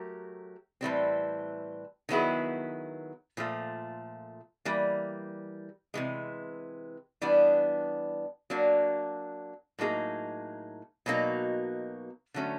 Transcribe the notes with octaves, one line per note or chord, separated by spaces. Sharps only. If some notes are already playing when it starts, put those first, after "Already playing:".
Already playing: F#3 A3 G4 A#4
A2 E3 G3 C4
D#3 F#3 B3 E4 G#4
A#2 F3 A3
E3 G3 A#3
C3 E3 G#3
E3 G3 B3 D4
F#3 A#3 D4
A2 F#3 A#3 D#4 G#4
B2 F#3 A#3 D#4
D3 F#3 A3 C#4